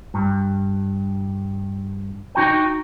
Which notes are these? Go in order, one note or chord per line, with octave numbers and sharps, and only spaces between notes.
G2
D#4 F#4 G5